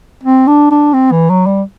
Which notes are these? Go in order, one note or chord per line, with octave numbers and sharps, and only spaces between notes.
C4
D4
D4
C4
E3
F#3
G3